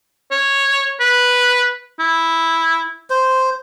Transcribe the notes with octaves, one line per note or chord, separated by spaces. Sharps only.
C#5
B4
E4
C5